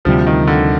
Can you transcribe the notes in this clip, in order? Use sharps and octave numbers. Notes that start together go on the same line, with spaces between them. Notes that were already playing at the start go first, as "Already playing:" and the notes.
D2 C3 F3 G3
D#3
D3